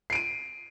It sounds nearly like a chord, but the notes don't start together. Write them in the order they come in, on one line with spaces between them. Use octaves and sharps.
C7 D7 D#7